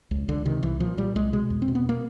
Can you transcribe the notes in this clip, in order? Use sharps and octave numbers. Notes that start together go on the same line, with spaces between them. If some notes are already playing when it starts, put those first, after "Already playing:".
C#2
C#2 D3
C3 D#3
C2 E3
A#2 F3
A#2 G3
C2 G#3
B2 G#3
E2
C4
B2
B3
A#3